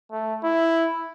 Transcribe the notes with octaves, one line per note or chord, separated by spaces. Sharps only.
A3
E4